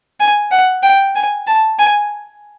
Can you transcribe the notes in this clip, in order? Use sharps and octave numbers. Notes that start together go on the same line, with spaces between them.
G#5
F#5
G5
G#5
A5
G#5